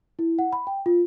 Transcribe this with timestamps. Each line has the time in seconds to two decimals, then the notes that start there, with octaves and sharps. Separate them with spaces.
0.19 E4
0.39 F#5
0.53 B5
0.67 G5
0.86 F4